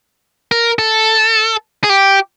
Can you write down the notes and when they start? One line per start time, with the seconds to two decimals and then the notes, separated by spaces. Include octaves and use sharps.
0.51 A#4
0.79 A4
1.84 G#4
1.89 G4